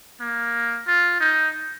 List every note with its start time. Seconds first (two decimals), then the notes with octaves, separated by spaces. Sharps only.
0.20 A#3
0.87 F4
1.20 D#4